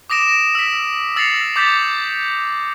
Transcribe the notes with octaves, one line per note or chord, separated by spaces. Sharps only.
D6 D#6 A#6 D7 E7
E6 B6
E6 A6 A#6 C7 C#7 F7
D6 G6 A6 B6